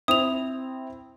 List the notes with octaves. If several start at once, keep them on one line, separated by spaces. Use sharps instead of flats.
C4 E4 C5 D#6 F7